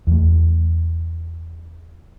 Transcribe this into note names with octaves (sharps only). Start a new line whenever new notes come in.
E2 A3